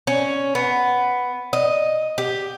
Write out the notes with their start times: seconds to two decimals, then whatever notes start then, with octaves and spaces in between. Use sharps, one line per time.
0.07 C#4
0.55 B3
1.53 D#5
2.18 G4